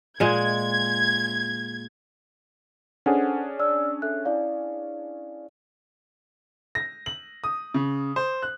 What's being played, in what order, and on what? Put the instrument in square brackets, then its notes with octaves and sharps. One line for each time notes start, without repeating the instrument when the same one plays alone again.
[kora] A#2 G#3 [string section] G#6
[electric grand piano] C#4 D4 G#4 [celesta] A4 C5 F#5
[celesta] D5 E6 F6
A4 E5 F#6
E4 D5 F5
[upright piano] A#6
F#7
D#6
C#3
C5
F#6